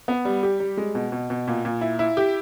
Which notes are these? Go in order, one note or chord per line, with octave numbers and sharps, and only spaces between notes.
B3
G3
G4
G3
G#3
B2
B2
B2
A#2
A#2
E4
E4
G4